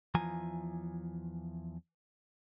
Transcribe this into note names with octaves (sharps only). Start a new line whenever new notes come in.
E2 E3 F3 F4 G#5 A#5